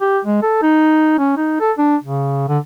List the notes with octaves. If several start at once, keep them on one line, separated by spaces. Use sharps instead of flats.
G4
G#3
A4
D#4
C#4
D#4
A4
D4
C#3
D3